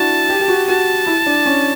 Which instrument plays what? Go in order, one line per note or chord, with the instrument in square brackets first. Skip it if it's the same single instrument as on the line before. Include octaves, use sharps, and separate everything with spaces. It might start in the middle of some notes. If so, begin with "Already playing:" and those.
Already playing: [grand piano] D4 E4 F#4 [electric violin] A5
[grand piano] G4
G4
F#4
[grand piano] F#4 [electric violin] A5
[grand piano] E4
D4
C#4